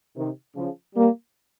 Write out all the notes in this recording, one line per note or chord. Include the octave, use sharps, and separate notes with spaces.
C3 D#3
C#3 F3
G3 A#3